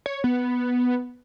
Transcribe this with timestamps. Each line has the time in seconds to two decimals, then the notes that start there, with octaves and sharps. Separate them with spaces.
0.06 C#5
0.24 B3